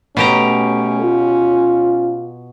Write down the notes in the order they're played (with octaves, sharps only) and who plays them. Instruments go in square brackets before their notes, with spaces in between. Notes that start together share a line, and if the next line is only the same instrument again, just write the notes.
[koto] B2 G4 A#5 [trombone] A3 [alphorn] C#4
[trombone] F4